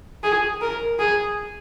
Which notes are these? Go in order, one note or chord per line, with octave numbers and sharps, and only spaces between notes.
G#4
A#4
G#4